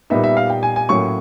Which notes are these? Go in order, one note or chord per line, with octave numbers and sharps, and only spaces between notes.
A#2 G3 B3 D#4 E5
E5
F5
G5
G#5
G#5
A2 F#3 A#3 C#4 C#6